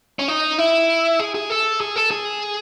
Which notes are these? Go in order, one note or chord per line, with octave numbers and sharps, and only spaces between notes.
C#4
D#4
E4
G#4
G#4
A4
G#4
A4
G#4